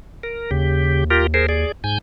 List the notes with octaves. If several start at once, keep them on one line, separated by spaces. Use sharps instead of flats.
A#4
D#2 C#3 G4
F4 G4 A#4
G#4 A#4 C5
G#4 D5
G#2 G#5 G6